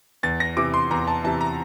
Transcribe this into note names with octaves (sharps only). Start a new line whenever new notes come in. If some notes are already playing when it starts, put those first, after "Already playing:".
E2 A6
A#6
C3 E3 D6
C6
E2 A#5
A5
C3 E3 A5
A#5